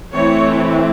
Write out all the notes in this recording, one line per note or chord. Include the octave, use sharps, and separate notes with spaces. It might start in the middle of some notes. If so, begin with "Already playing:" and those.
E3 A3 C4 E4 C#5